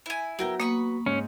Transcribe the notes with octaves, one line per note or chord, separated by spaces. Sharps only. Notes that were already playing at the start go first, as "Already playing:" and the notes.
E4 G#5
F#3 B3 E4 A#4 G5
A#3 B5 C#6 D#6
G#2 C#4